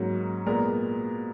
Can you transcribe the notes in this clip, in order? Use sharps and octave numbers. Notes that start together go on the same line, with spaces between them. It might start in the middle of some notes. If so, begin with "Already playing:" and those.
Already playing: G#2 F#3 A#3 C#4
A#2 G#3 B3 A#4